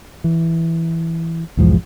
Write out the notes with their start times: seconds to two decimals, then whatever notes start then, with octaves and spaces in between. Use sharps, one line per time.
0.24 E3
1.57 B1 E2 G#2 F3